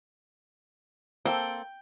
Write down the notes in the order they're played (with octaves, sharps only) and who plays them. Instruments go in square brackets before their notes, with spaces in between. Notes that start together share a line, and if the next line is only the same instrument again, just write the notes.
[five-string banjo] A#3 C4 A4 [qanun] G5